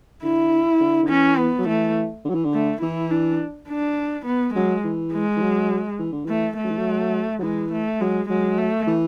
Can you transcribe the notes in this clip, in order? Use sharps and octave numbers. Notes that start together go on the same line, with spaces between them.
D3 E4
D3
D3
E3 C#4
B3
F#3
E3 A3
D3
F#3
E3
D3
A3
E3 E4
D4
D4
B3
F#3 G#3
E3
G#3
E3
F#3
E3
D3
E3 A3
A3
F#3
E3
F#3
F#3
E3 G#3
A3
F#3 G#3
F#3 G#3
A3
E3